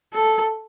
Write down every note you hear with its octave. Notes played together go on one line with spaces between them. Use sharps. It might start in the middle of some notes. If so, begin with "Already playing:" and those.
A4